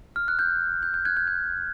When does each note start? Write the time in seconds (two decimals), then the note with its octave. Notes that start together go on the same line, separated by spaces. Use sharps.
0.16 F6
0.28 F#6
0.39 G6
0.83 G6
0.94 G6
1.05 F#6 G#6
1.17 G6
1.27 G6